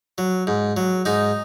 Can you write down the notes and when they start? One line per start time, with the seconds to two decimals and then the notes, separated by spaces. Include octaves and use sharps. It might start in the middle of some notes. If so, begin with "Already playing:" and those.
0.18 F#3
0.47 G#2
0.77 F#3
1.05 G#2 D#4